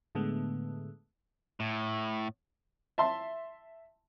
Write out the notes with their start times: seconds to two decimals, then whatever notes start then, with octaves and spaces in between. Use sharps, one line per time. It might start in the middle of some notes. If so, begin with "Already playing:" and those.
0.15 A2 D3 G#3 A3 B3
1.60 A2
2.98 E5 A5 C6